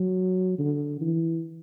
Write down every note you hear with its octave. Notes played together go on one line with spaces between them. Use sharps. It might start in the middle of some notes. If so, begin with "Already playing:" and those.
Already playing: F#3
D3
E3